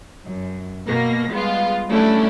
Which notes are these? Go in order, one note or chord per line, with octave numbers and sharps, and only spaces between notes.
F#2
B2 A#3 A#6
G3 G#3 B3 F4
F#3 G3 A3 C#4 D4 E4